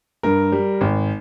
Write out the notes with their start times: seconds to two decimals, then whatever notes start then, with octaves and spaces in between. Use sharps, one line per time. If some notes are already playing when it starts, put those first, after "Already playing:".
0.23 G2 A#4
0.52 G3
0.81 G#1